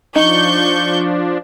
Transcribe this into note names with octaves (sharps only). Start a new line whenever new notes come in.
F3 D4 D#4 C#6 G6